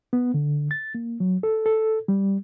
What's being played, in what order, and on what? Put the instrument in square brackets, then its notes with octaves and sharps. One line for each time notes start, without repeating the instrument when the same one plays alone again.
[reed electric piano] B3
D3
A6
A#3
F#3
A4
A4
G3